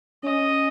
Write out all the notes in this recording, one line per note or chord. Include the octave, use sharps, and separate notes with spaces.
C#4 D#5